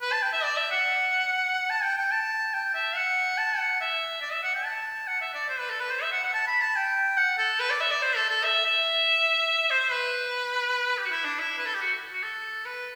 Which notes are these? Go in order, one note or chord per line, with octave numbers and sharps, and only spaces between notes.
B4
A5
G5
E5
D5
E5
F#5
A5
G5
G5
A5
G5
E5
F#5
A5
F#5
E5
D5
E5
F#5
G5
A5
F#5
E5
D5
C5
B4
A4
B4
C5
E5
F#5
F#5
A5
B5
A5
G5
F#5
A4
B4
D5
E5
D5
C5
A4
A4
E5
E5
C5
B4
G4
F#4
E4
D4
E4
B4
A4
G4
F#4
F#4
A4
B4